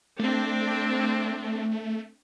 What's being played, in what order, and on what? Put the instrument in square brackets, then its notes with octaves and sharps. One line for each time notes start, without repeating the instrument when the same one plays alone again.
[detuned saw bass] A3 [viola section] C4 D4